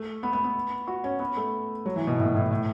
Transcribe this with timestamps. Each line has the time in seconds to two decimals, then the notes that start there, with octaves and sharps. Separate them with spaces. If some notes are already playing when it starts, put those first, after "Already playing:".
Already playing: A3
0.23 B3
0.33 B3
0.44 B3
0.87 F#4
1.04 C#4
1.20 B3
1.37 A3
1.86 F#3
1.96 E3
2.07 B2
2.18 A2
2.26 B2
2.35 A2
2.42 B2
2.51 A2